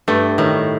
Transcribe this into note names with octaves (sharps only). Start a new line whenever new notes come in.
G2 A3
A2 D#3